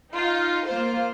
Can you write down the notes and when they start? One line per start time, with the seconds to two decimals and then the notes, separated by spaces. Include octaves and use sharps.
0.14 D#4 F4
0.67 A#3 F4 C5